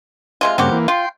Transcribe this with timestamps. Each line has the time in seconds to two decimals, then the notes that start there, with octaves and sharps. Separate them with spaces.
0.41 C3 G#3 F4
0.58 G2 C#3 A#3 C4 F#4 G4
0.71 E3 A#3
0.88 F4 G5 C6